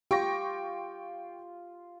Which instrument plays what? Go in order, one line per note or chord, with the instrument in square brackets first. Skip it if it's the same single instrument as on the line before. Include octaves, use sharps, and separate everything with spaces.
[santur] F4 [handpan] G4 [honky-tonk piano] G5 C#6 A#6